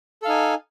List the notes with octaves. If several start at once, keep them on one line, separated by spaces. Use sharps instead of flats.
D#4 A4 F5 G#5